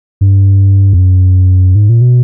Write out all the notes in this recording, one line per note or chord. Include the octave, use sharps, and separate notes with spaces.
G2
F2
F#2
G#2
A#2
B2